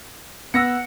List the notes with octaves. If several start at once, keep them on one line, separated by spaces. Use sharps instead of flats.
B3 F#5 E6 A#6 C#7